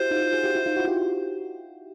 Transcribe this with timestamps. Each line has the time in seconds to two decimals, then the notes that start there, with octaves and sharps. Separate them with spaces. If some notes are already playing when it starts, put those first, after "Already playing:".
Already playing: E4 F#4 G4 C5
0.11 D#4 F4
0.33 F#4 G#4
0.44 F4 G4
0.55 E4 F#4
0.66 D#4 F4
0.77 E4 F#4
0.88 F4 G4